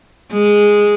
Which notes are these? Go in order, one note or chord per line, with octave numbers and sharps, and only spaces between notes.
G#3